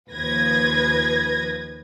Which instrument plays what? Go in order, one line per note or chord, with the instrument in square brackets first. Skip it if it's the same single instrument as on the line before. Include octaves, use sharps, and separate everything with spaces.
[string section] D#2 F3 B4 G#6 A#6